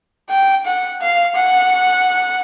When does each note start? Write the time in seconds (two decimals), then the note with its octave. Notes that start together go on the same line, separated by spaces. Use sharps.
0.30 G5
0.65 F#5
1.01 F5
1.35 F#5